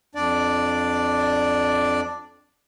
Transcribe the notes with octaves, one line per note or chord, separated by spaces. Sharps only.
F2 D4 D5